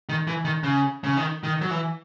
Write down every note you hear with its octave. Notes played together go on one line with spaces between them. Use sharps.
D#3
E3
D#3
C#3
C#3
D#3
D#3
F#3
E3